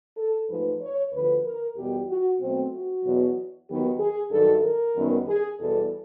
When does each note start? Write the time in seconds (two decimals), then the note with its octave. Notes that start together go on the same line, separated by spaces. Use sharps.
0.17 A4
0.49 G#2 F3 A3 B4
0.81 C#5
1.13 D2 D3 F3 B4
1.45 A#4
1.77 E2 B2 G3 G4
2.09 F#4
2.40 B2 F#3 A3 C4
2.72 F#4
3.04 E2 B2 F#3
3.68 D#2 D#3 F#3 B3 G4
3.99 G#4
4.32 G2 D#3 F#3 A4
4.63 A#4
4.95 F#2 D#3 G3 B3
5.27 G#4
5.59 E2 B2 G3 A4